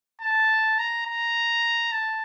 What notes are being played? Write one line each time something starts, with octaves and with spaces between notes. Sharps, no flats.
A5
A#5
A#5
A5